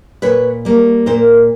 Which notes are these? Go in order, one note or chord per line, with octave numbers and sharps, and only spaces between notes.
A#2 B4 C#5
G3 A#3
A#2 A#4 C5